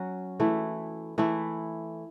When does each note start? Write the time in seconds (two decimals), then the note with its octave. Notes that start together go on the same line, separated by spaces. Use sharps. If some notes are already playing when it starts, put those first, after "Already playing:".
Already playing: F#3 C#4 F#4
0.40 E3 A3 E4
1.18 E3 A3 E4